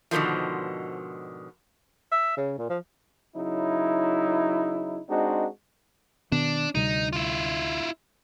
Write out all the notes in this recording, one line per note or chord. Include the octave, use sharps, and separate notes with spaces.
G#2 B2 D3 D#3 F3
E5
C#3
A#2
F3
C#3 F#3 D#4 E4
G#3 C4 D4 D#4 F#4
B2 D#3 B3 D4
D2 C3 G3 D#4
E4 F4